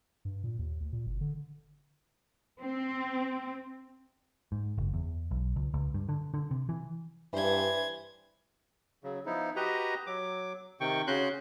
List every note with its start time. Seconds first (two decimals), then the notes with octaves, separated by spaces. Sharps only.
0.25 G2
0.44 A#2
0.59 D#2
0.81 D2
0.93 A#2
1.07 F#1
1.21 D3
2.62 C4
4.52 G#2
4.78 F#1
4.94 E2
5.31 B1
5.56 C#2
5.74 C#2
5.94 G2
6.09 D3
6.34 D3
6.51 C3
6.69 E3
7.34 G2 E3 C5 G#6
9.04 C#3 F#3
9.26 F3 B3 D#4 E4
9.56 F#4 G4 B4 D#5 A#5
10.07 F#3 D6
10.80 C3 D#3 G5 C#6
11.07 C#3 C#4 F#4 C6 F#6 G6